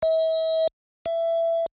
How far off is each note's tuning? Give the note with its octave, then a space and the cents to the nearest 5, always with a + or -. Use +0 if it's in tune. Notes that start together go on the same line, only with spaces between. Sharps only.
E5 -40
E5 +15